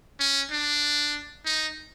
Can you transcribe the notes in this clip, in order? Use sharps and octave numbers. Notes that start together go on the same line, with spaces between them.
C#4
D4
D#4